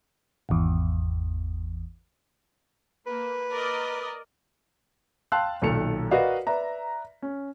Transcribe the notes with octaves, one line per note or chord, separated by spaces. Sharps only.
G#1 E2
A#3 B4
A#4 D5 D#5
F5 G5 A5 C6 E6 F#6
B1 A#2 D#3 A4 C#7 F7
F#4 A#4 B4 D5 D#5 F5
B4 D5 E5 A#5
C#4